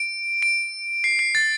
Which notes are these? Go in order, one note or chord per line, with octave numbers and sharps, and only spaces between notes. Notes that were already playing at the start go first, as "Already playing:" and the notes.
Already playing: D7
D7
C7
C7
A6